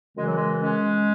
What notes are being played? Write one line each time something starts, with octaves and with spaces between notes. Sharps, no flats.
F#2 C#3 E3 G#3
F#3
G#3
G#3 C#4